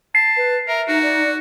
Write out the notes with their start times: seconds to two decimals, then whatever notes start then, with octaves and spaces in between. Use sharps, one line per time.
0.15 A5 C7
0.37 B4
0.68 A#4 E5 A#5
0.88 D#4 F#4
1.03 D5